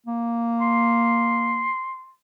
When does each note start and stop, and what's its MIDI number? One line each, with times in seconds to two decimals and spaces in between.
0.06 1.69 58
0.60 2.12 84